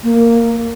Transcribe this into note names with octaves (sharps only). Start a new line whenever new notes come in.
A#3